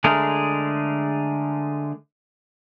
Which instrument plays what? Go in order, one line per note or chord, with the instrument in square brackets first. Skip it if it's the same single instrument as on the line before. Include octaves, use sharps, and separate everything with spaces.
[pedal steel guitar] D3 G#3 A3 G#4 A#4